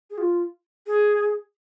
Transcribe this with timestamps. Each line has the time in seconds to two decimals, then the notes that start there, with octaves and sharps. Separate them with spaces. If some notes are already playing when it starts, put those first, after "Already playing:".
0.10 G#4
0.18 F4
0.87 G#4